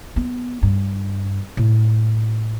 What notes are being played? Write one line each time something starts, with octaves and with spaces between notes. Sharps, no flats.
B3
G2
A2